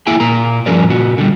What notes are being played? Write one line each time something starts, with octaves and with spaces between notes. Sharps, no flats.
A#3 E4 G#4 G5 G#5
A#2 A#3 A#5
G2 F3 C#4 G#4 A#4 D5
A#2 F#4
D3 G3